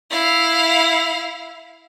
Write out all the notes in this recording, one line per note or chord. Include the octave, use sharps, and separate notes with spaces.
E4 F5